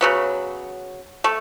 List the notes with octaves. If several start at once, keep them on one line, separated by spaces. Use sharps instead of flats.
C#3 F#3 B3
A3